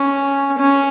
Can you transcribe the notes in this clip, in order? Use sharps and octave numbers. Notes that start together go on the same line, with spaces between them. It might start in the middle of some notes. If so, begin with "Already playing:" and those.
Already playing: C#4
C#4